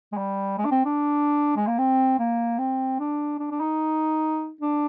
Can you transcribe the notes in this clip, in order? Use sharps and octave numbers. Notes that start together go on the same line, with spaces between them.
G#3
G3
G#3
D4
C4
D4
G#3
A#3
C4
A#3
C4
D4
D4
D4
D#4
D4